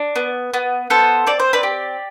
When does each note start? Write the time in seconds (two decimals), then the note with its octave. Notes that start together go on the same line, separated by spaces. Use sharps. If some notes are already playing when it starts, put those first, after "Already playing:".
Already playing: D4
0.16 B3
0.54 B3
0.90 B3 A4 C5
1.27 C4 D5
1.40 C5
1.53 B4 D5
1.63 G4